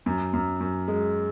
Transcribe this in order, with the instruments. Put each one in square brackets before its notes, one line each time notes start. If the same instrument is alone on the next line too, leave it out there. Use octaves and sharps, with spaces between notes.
[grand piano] F#2
F#2
F#2
G#3